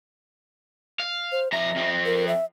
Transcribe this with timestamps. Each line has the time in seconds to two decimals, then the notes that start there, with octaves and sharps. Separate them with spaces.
1.00 F5
1.32 C5
1.52 F2 E5 A#5
1.76 F2 C4
2.05 A#4
2.28 E5